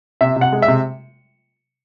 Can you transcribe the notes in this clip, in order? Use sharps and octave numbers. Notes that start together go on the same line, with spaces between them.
C3 E5
C3
F#5
G#3
E5
C3